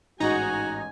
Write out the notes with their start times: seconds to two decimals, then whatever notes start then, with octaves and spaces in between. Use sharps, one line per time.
0.20 A1 G#2 D#4 F#4 D#5 G#5 A#5